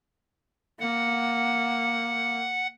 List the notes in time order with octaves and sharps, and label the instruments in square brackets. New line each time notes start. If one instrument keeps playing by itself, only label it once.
[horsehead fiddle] A#3 [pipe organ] F#5